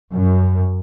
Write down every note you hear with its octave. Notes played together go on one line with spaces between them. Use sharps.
F#2